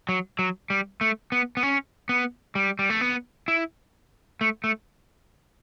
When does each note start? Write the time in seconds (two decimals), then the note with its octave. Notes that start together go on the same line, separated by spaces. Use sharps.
0.09 F#3
0.39 F#3
0.70 G3
1.01 A3
1.32 B3
1.57 B3
1.63 C#4
2.09 B3
2.55 G3
2.79 G3
2.90 A3
3.01 B3
3.48 E4
4.41 A3
4.64 A3